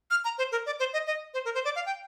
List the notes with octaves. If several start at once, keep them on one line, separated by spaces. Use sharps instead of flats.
F6
A#5
C5
A#4
D5
C5
D#5
D#5
C5
A#4
C5
D5
F5
G5